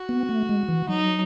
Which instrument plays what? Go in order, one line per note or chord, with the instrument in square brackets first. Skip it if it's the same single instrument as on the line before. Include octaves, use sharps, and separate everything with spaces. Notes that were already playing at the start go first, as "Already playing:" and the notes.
Already playing: [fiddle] F#4
[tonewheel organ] B3
A3
G#3
E3
[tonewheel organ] F#3 [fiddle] D#4